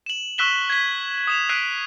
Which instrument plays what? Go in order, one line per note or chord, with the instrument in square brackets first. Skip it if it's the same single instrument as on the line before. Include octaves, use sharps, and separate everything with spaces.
[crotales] E7 F#7
C#6 E6 F#6 B6 E7 G7
G#6 B6
D#6 E7 F7
E6 F#6 B6 C7 D7 D#7